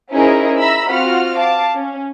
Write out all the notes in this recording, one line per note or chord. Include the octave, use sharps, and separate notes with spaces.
C#4 D#4 E4 G#4 A#4 C5
E5 A#5 B5 E6
C4 F4 F#4 F#5 F6
F5 A5 D6
C#4